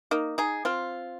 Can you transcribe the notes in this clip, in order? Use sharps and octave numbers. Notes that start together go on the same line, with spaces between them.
A#3 D#4
D#4 G#4
C4 F4